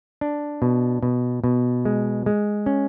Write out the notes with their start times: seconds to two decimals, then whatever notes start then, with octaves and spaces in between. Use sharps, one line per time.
0.21 D4
0.62 B2
1.03 B2
1.44 B2
1.85 G#3
2.26 G#3
2.66 C#4